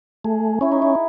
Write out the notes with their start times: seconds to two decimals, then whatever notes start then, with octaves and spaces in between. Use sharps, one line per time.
0.24 A3 G#4
0.61 C#4 E4
0.72 D#4
0.82 E4